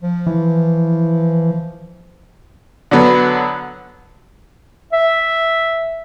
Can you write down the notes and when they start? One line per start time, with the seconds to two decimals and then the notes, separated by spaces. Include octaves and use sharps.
0.02 F3
0.27 E3
2.91 D3 F#3 B3
4.93 E5